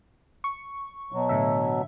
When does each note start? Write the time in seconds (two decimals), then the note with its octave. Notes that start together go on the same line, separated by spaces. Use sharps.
0.44 C#6
1.13 B2 F#3
1.29 A2 D3 E5